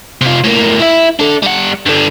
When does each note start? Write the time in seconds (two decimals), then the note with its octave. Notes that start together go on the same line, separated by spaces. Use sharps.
0.21 C3 F4
0.44 A2 A#3
0.80 E4 E5
1.20 D4 A4
1.43 G3 F#5
1.86 G2 D3